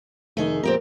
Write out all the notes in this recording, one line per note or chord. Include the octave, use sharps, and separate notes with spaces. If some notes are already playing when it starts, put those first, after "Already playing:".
F1 D#3 A3 G#4 D#5
F2 A#2 C4 G4 A#4